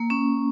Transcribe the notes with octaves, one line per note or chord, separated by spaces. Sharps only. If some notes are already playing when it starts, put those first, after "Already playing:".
Already playing: A#3
C#4